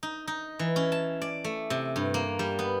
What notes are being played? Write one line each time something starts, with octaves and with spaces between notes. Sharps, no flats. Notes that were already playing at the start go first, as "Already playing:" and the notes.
D#4
D#4
E3
C#4
A5
D5
A3
C3
G2
A#3
G3
B3